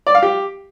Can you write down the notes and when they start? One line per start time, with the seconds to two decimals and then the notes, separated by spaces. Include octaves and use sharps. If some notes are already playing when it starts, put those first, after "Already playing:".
0.07 D5
0.15 F5
0.23 G4